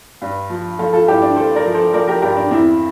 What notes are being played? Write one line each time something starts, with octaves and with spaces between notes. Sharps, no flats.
G2
F3
F3 F4 A4
F4 A4
G2 E4 G4
D4
G2 A4 C5
A#4 D5
F3
A4 C5
F3 A#4 D5
G4 A#4
G2 G4 A#4
D4
E2 C4 E4